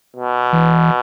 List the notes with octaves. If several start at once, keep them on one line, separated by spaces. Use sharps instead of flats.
B2
E3